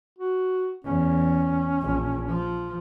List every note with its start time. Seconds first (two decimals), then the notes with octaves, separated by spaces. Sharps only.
0.19 F#4
0.84 E2 C#4
1.81 A#1
2.28 F3